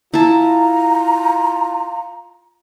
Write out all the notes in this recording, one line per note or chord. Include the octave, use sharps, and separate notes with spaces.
E4 F4 A5 A#5